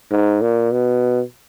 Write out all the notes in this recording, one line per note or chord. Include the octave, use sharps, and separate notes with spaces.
G#2
A#2
B2